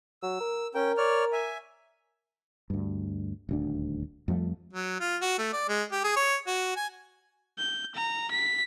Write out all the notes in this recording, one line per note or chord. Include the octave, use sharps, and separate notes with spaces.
F#3 E6
A#4
C#4 A#4 G5
C#5 D5 F6
E5 G#5
D2 G2
D#1 D2 D4
F2 F3 G3 A3
F#3
F4
F#4
A3
D5
G#3
G4
G#4
C#5
F#4
G#5
G6
A#5
B6